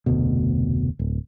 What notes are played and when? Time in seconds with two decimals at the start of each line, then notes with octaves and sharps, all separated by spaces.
0.06 F1 D2 B2
0.99 D1